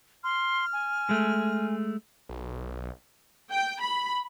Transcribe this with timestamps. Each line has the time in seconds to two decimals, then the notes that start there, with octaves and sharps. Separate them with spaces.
0.24 C6 F6
0.73 G#5
1.09 G#3 A3
2.29 B1
3.51 G5
3.80 B5